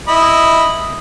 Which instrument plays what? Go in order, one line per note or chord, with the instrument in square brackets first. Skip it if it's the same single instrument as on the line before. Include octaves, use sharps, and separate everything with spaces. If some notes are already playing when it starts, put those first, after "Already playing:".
[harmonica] E4 D#5 B5